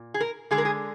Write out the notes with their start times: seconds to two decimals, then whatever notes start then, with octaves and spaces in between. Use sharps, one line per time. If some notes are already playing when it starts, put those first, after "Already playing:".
Already playing: A#2
0.14 G#4
0.21 A#4
0.51 D3 G#3 G#4
0.58 A#4
0.65 G#4